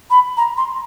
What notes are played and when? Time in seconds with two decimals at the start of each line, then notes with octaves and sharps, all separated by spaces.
0.10 B5
0.37 A#5
0.57 C6